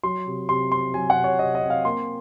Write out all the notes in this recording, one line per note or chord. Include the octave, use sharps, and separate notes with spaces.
F#3 C6
C3
C3 C6
C4 C6
F#3 G#5
F#5
C3
C#5
C3 D#5
D#5
C4
F5
A#3 C6